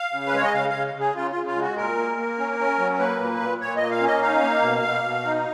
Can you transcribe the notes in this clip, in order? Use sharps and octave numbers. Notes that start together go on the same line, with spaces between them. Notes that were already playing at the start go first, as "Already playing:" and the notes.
Already playing: F5
C#3
B4
G#3 C#5
D#5
C#3 F5
C#3 F5
C#3
G#4
C#3 F4
C#3 F4
F4
G#3
F#4
A#2 A#4
A#3
A#3
C#4
C#4
F#3
A#3 B4
A#2
A#2
A#2 C#5
D#5
A#3
F5
C#4
D#5
D#4 F5
A#3
B2
B2
B2
D#4